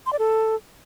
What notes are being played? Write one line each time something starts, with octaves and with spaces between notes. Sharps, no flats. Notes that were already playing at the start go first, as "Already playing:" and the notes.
C6
D5
A4